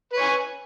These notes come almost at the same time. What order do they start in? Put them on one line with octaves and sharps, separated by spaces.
B4 C#5 G#5